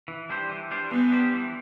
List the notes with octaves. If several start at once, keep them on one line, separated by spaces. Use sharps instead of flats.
E3
G3 D4 G4 C5
E3
G3 D4 G4 C5
E3 B3
G3 D4 G4 C5
E3